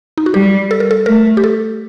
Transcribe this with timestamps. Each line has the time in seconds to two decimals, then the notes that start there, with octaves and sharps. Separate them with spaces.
0.18 D#4
0.26 F#4
0.34 G3 G4
0.71 A4
0.80 A#4
0.91 A4
1.06 A3 A#4
1.37 G4
1.44 A4